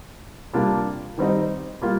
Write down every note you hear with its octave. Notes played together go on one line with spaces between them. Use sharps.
C3 G3 A#3 D4 F4
D#3 G3 C4 D#4
G3 A#3 F4